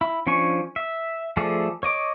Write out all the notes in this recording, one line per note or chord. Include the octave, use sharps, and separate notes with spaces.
E4
F3 C#4 D4 G#5 C#6
E5
F3 A3 G#4 A4 D5
C#5 D#5 D6